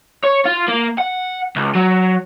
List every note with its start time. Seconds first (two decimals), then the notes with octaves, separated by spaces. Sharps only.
0.23 C#5
0.45 F4
0.68 A#3
0.98 F#5
1.56 C#2
1.75 F#3